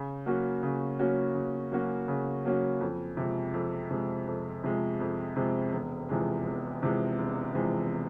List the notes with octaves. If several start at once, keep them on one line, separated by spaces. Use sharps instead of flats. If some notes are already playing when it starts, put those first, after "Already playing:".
Already playing: C#3
F#3 A#3 C#4 F#4
C#3
F#3 A#3 C#4 F#4
C#3
F#3 A#3 C#4 F#4
C#3
F#3 A#3 C#4 F#4
F2
C3 F3 G#3
F2
C3 F3 G#3
F2
C3 F3 G#3
F2
C3 F3 G#3
E1
E2 C3 F3 G#3
E1
E2 C3 F3 G#3
E1
E2 C3 F3 G#3